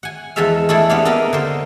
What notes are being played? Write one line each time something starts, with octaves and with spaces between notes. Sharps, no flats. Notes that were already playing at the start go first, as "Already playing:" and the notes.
F#5 G#5
E2 F3 G#3 A4 E5 F5
A3 D4 E4 G#4 A4
B3 C4 D4 G4 F5
A#3 B3 D4 A#4 D#5 F5
D3 C5